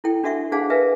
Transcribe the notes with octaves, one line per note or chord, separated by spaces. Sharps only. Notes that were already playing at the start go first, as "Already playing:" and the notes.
E4 A4 G5
D4 F#4 A4 E5 F#5 C#6
D4 G#4 C5 F5 F#5 A5
A#4 B4 E5 F5 G#5